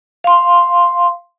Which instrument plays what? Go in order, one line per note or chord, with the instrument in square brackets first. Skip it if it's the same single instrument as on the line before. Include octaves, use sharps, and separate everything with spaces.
[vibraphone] F5 C6